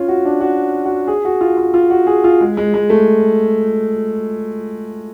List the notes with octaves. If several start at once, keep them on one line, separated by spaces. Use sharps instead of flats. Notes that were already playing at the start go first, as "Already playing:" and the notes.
Already playing: C#4 F4
F#4
D4
F#4
F#4
G#4
F#4
F4
F4
F4
F#4
G#4
F4
G#3
G#3
G#3
A3